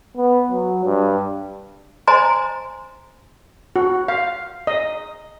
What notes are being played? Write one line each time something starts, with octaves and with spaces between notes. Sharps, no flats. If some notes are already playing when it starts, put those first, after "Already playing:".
B3
F#3
G2
C5 D#5 G#5 A#5 C6
F#4
F5
D#5